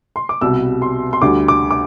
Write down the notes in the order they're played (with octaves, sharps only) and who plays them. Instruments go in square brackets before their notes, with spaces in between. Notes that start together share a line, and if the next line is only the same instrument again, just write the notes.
[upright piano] C6
D6
C2 B2 G3 E6
C6
C6
D2 D3 G3 D6
D6
D6